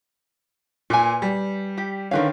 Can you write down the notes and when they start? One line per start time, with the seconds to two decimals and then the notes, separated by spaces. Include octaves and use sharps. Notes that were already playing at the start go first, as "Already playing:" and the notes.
0.90 A#2 B4 G#5
1.22 G3
1.78 G4
2.11 D3 D#3 C#4 A#4 B4 F5